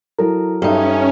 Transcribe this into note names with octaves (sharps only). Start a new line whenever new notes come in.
F#3 E4 A4 A#4 A#5
G2 C#4 D#4 A4 D5 E5